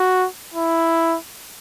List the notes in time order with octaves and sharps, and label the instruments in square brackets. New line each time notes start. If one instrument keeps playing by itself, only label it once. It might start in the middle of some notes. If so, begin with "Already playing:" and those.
Already playing: [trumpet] F#4
E4